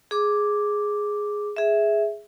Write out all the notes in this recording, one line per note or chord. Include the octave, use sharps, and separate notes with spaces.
G#4 D6
G#4 E5